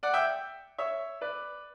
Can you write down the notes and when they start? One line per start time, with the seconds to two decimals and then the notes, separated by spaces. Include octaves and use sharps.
0.03 D5 F#5
0.14 E5 G5
0.78 C#5 E5
1.21 B4 D5